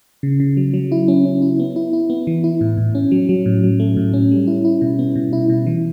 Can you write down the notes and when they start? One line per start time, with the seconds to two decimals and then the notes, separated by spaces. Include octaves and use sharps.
0.23 C#3
0.40 C#3
0.57 F#3
0.74 F#3
0.92 E4
1.08 C#4
1.25 C#4
1.42 E4
1.60 B3
1.76 E4
1.93 E4
2.10 B3
2.27 E3
2.44 E4
2.61 A2
2.77 A2
2.95 C#4
3.12 F#3
3.29 F#3
3.46 A2
3.63 F#3
3.80 A3
3.97 A2
4.13 C#4
4.31 G3
4.47 E4
4.65 E4
4.81 B2
4.99 B3
5.16 B2
5.33 E4
5.49 B2
5.66 E3